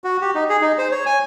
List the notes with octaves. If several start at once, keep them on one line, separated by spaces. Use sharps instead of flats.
F#4
G4
D#4
G#4
D#4
C5
C#5
G#5